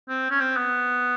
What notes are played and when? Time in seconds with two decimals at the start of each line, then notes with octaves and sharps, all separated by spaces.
0.09 C4
0.30 C#4
0.40 C4
0.56 B3